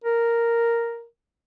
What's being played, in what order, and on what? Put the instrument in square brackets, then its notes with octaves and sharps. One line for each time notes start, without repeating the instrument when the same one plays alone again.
[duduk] A#4